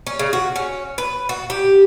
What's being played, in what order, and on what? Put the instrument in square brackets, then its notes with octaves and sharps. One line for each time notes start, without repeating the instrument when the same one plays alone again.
[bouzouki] C#4
C#3
F#4
C#4
B4
F#4
G4